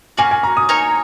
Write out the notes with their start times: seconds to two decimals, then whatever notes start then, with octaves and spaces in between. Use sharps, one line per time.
0.17 A#3 C#4 F#4 G#5
0.31 G#5
0.43 A#5
0.57 D#6
0.69 D#4 A#4 C#5 G#5